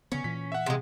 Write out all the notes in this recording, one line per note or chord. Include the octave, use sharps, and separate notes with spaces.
C#3 B3 C#4
A#2 E3 B6
E5 F#5
C3 G#3